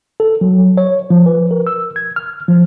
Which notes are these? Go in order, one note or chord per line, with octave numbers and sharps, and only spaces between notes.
A4
F#3
C#5
F3
B4
A#4
E6
G#6
F6
F3